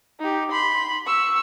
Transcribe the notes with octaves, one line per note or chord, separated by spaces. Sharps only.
D#4 G4
B5 C6
C#6 E6